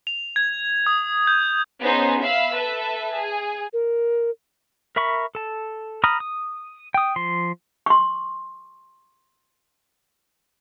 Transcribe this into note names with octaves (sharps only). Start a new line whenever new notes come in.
F7
G#6
D#6
G6
B3 C#4 D#4 G#4 C5
E5 F5 B5 E6
A4 B4 E5 A5
G#4
A#4
A#4 E5 B5 C#6
A4 A5
A#5 B5 D#6 F6
D#6
G5 D#6
F3 C6
C6 C#6